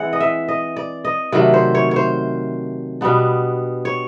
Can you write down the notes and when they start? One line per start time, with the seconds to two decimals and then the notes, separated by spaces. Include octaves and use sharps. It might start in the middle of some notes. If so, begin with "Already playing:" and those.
Already playing: E3 G#3 C4 F#5
0.13 D#5
0.20 E5
0.48 D#5
0.76 D5
1.05 D#5
1.32 C3 D#3 F#3 A3 D5
1.54 C5
1.75 C#5
1.91 C5 C#5
3.01 B2 G3 B3 D4
3.85 C#5